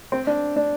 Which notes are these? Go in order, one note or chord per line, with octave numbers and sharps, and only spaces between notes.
C4
D4
D4